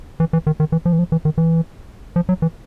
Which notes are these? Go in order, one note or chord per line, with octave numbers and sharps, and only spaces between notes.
E3
E3
D#3
D#3
E3
F3
E3
F3
E3
D#3
E3
F3
F#3
E3